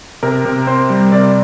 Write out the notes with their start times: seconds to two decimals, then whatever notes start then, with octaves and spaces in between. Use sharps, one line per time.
0.23 C3 A#4
0.45 C3
0.67 C4 C5
0.90 G3
1.12 C3 D5